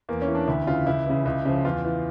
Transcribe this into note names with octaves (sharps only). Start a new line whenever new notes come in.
E2 A#3
C#4
E3
D4
D2 E4
C#3 E3 F4
C#2 E4
C#3 E3
C#2
C#3 F3
E2 F4
E3